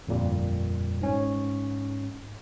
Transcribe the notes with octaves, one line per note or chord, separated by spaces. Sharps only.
G1 F2 A#2 G3
G#2 C#4